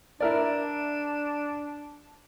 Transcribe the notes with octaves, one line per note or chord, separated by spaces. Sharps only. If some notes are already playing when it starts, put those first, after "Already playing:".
D4 E4 A#4 D5